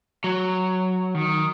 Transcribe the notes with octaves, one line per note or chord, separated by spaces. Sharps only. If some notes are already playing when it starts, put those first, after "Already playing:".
F#3
D#3